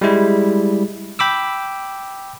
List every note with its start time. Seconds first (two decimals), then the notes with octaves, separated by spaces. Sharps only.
0.01 G3 G#3 E4
1.19 G5 B5 D6 E6